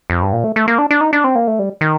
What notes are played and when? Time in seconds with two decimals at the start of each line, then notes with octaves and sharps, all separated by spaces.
0.10 F2
0.22 G2
0.33 A#2
0.44 A3
0.56 A3
0.68 A#3
0.78 D4
0.91 D4
1.01 D#4
1.13 D4
1.24 C4
1.35 A#3
1.48 A3
1.59 G3
1.81 D#3